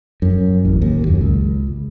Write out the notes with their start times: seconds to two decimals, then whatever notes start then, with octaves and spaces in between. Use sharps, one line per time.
0.22 F#2
0.65 A1
0.82 D#2
1.07 F#2
1.21 C#2